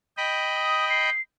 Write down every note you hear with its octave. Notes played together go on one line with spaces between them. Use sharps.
D#5 G5 B5
D#6
C7